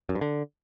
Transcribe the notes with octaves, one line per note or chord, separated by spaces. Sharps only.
F#2
G2
D3